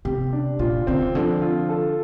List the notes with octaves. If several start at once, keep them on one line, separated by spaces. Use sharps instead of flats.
C3 G4
D4
A#2 F4
D3 C4
C3
D3 F3
F4
A4